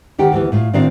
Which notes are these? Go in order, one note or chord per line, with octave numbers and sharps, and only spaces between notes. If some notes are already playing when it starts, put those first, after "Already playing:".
D2 D#3 G4 F#5
D2 E3 B3
A2 F4
A2 D#3 C4 D4 F#4 F5